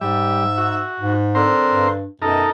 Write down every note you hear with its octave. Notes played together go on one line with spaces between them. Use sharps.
G#2 G3 E5
F#4
G#2
D3 C4 A#4 C5
G2
F#2 B2 D#4 A4 A#4